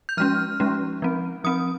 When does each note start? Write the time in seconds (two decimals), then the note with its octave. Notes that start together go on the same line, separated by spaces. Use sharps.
0.09 G6
0.17 F3 G#3 C#4 F6
0.60 F3 G#3 C#4
1.02 F3 C4
1.44 F3 C4 D#6